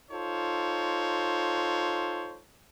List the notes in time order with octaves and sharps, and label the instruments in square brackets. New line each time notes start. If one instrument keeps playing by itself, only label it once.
[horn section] D#4 F4 A4 C5 C#5